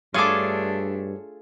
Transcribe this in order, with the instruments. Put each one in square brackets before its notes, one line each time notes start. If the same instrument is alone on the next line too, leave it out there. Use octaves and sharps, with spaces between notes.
[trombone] G2 [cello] A3 D4 [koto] F4 G#4 A4 [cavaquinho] C#5 D6